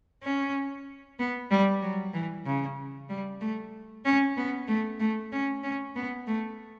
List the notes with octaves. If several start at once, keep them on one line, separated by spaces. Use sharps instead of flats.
C#4
B3
G3
F#3
E3
C#3
G3
A3
C#4
B3
A3
A3
C#4
C#4
B3
A3